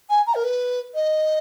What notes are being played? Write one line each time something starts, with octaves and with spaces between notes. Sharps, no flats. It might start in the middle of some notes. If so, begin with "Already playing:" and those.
G#5
A#5
A#4
B4
D#5